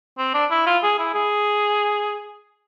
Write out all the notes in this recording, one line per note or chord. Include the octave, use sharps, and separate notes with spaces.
C4
D4
E4
F4
G#4
E4
G#4